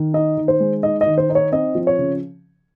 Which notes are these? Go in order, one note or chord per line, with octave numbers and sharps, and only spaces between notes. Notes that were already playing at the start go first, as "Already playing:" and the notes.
Already playing: D#3
D#4 D#5
D#3
C5
G#3
D#4 D#5
D#5
D#3
C5
D#4
C#5
C4 D#5
F3
C#5
C#3